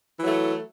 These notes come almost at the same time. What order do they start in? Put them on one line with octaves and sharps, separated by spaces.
E3 F#3 A3